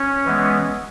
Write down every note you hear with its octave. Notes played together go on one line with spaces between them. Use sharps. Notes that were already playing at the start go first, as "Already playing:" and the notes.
Already playing: C#4
E3 G#3 B3